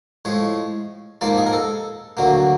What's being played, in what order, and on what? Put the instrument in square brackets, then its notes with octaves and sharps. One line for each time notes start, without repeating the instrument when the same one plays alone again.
[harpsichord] A2 F3 G#3 C#5
G#2 F3 A#3 D5
G#4
A#4
A4
D2 D3 F#3 A#3